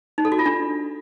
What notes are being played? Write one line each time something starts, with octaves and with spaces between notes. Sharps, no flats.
D#4
A4
F#4
F4
D4